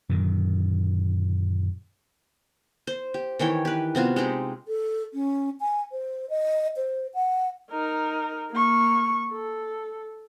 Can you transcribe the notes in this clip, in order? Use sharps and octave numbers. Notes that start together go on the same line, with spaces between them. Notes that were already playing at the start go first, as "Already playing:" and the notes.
F#2 A#2 D3 D#3
C5
G4
D#3 E3 C#5 G5
G4 B4
C3 B3 F4 F#4
G#3 C4 D#4 G4
A4
C#4
G#5
C5
D#5
C5
F#5
D#4 A#4
A#3 C#6
A4